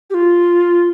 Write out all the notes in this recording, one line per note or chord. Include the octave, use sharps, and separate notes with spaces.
G4
F4